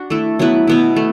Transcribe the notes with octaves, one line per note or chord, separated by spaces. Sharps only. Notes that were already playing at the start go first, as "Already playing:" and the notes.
Already playing: D4 F#4
A3 E4 A4
F#3 B3 E4 B4
B2 B3 E4
A3